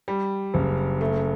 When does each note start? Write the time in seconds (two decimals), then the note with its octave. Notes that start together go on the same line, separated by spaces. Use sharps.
0.08 G3
0.54 F#1
1.01 A3